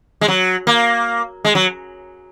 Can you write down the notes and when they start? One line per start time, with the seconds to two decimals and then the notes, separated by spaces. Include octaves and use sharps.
0.21 G#3
0.28 F#3
0.67 A#3
1.45 G#3
1.55 F#3